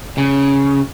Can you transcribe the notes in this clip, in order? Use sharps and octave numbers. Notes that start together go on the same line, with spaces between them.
C#3